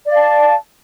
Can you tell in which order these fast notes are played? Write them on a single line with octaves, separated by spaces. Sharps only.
D5 F5 A5